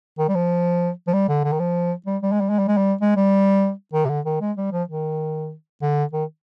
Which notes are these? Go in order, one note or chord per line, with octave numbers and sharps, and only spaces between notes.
D#3
G3
F3
F3
G3
D3
D3
D#3
F3
G3
G3
G#3
G3
G#3
G3
G#3
G3
G#3
G3
D#3
C3
D3
D#3
G#3
G3
F3
D#3
D3
D#3